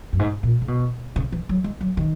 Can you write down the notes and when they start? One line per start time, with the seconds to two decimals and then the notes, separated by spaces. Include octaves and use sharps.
0.13 F#2
0.19 G#2
0.43 A#2
0.62 C#3
0.68 B2
1.16 C#3
1.32 E3
1.49 F#3
1.64 G#3
1.81 F#3
1.97 D#3